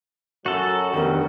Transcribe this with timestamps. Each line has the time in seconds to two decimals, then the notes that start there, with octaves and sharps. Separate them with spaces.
0.46 F#2 F#3 F#4 A4
0.94 F1 E2 G2 D#3 A#4